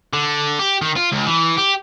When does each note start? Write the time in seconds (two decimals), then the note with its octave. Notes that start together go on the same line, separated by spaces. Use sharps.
0.13 D3
0.60 G4
0.82 D#3
0.96 F4
1.12 C#2
1.26 E3
1.57 G4